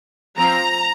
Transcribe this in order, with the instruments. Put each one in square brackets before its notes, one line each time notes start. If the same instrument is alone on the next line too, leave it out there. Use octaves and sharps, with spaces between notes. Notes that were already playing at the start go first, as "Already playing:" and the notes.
[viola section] F3 C4 A#5